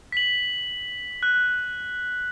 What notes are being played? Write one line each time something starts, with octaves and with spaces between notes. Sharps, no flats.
B6 F#7
F#6